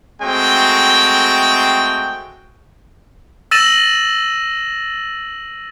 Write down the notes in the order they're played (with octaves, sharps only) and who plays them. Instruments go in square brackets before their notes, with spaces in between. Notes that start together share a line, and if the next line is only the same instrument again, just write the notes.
[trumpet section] G#3 A3 C4 F#4 G5
[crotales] E6 A6 A#6 D#7 E7 F#7